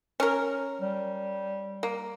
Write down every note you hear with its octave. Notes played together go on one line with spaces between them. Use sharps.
C#4 A#4
G3
A#3